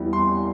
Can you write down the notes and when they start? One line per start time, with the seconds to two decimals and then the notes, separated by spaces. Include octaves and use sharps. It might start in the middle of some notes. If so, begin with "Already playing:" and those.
Already playing: E2 E3 G3
0.13 C6